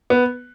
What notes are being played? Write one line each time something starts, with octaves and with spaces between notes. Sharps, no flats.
B3